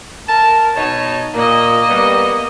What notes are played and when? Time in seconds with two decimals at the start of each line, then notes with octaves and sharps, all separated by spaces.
0.28 A#4 A5
0.75 B2 D#4 C#5 A5
1.34 A#2 A#3 D#5
1.88 G3 B3